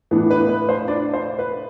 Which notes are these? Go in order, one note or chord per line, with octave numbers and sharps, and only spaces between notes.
A2 E3 B3 D4
B4
B4
C5
D4 D5
C5
B4